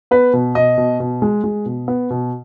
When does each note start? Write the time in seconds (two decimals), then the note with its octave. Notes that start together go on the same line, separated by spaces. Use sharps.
0.11 B3 B4
0.33 B2
0.55 B2 D#5
0.78 B2
1.00 B2
1.22 G#3
1.44 G#3
1.66 B2
1.88 B3
2.10 B2